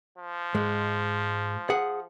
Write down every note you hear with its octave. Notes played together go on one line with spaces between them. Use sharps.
F3
G#2 G#3
G#4 F#5